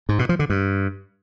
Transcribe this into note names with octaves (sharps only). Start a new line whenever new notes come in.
G#2
B2
F3
D3
G2